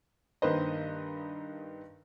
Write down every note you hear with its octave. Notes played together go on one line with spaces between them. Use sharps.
G2 D#3 A#3 B4 C5 D#5